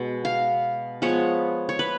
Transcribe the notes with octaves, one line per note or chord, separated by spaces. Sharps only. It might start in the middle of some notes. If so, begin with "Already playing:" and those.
Already playing: B2 G#3
F5
F3 G#3 B3 C#5
C#5
B4